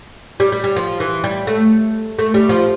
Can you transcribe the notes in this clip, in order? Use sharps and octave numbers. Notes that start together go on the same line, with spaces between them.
G3
G3
G3
F3
E3
G3
A3
A3
G3
F3